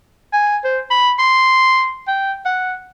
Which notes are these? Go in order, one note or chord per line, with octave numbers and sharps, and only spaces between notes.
G#5
C5
B5
C6
G5
F#5